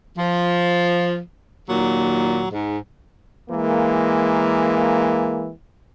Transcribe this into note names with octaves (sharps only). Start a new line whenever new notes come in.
F3
D#2 A#2 F#3
G#2
E3 G#3 A#3